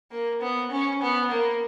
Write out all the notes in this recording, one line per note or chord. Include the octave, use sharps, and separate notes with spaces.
A#3
B3
C#4
B3
A#3